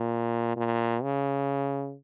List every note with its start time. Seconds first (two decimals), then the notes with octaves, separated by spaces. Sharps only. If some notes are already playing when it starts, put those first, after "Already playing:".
Already playing: A#2
0.57 A#2
1.03 C#3